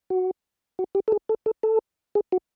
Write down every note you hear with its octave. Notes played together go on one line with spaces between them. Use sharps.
F#4
F#4
G4
A4
G#4
A4
A4
A4
G#4
F#4